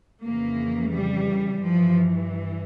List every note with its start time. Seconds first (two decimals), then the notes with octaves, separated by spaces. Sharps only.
0.22 F2 C#3 E3 A#3
0.91 G3
1.60 G2 E3 F3